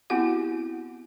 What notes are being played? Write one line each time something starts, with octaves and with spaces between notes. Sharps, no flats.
B3 C4 E4 F#4 G4 F#5